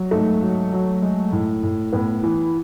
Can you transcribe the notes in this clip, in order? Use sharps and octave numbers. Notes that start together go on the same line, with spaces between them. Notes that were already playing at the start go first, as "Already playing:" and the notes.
Already playing: F#3
G#2 A3
F#3
F#3
G#3
A2
A2
A2 B3
E3